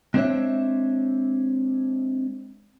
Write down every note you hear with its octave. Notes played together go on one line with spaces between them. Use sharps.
G#3 C4 D4 C5 C#5 E5